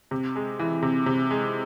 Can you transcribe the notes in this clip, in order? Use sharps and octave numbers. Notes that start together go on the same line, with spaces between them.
C3
G#3
E3
C3
C3
G#3